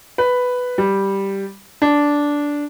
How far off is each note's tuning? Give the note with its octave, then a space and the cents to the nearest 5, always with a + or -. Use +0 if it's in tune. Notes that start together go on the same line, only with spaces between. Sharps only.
B4 +5
G3 +0
D4 -10